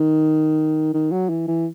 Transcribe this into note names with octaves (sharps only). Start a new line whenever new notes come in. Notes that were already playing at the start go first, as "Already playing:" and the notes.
Already playing: D#3
D#3
F#3
E3
E3